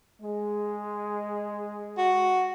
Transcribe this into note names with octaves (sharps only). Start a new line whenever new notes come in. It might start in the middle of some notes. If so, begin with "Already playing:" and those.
G#3
F#4